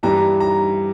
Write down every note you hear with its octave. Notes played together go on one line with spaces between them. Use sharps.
G2 E3 G3 A#5
A#5